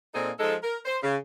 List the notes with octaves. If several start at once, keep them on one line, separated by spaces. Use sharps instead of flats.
A#2 A#3 C4 D#4 G#4 A4
F3 G#3 D#4 A4
A#4
C5
C#3